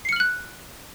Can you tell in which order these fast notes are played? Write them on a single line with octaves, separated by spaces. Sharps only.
C7 C#7 F6 F#7 F#6